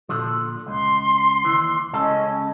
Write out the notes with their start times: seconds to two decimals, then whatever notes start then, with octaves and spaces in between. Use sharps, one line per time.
0.09 A#2 D3 F3 A4
0.67 C#2 C6
1.45 D#2 E3
1.93 C#2 C#3 C#4 A4 D#5